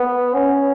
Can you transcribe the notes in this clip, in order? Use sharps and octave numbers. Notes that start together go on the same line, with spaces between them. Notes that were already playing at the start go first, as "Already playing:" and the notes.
Already playing: B3
C#4